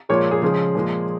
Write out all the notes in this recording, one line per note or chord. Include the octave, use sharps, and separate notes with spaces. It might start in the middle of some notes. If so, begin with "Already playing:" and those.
A#2 F3 G#3 C#5
G#4
C#3 F3 G#3
A#2 F3 G#3